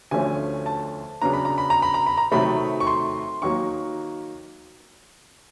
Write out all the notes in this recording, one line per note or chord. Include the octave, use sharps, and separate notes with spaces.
D2 D3 F3 A3 C#4 G#5
A5
C#3 F#3 B3 D4 A#5
B5
A#5
B5
A#5
B5
A#5
B5
A#5
C3 D#3 F#3 A3 B5
C#6
C6
D#3 F#3 A#3 C#6